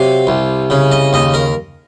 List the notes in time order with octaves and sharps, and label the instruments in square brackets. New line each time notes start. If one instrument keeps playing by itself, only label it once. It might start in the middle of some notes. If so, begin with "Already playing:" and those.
Already playing: [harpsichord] C3 F#3 F5
C2
C#3
D#5
D#2 D#5
A#4